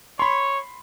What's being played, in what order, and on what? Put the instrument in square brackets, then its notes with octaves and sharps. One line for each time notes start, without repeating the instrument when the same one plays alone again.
[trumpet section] C#5 [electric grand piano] B5 C6